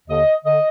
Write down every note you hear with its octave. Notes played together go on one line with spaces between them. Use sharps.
D#2 D3 D#5
D3 D#5